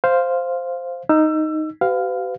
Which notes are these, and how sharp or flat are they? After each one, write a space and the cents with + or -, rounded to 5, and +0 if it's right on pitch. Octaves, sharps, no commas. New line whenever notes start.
C5 +0 F5 -5
D#4 +0 E6 +25
G4 -45 B4 +40 F5 +0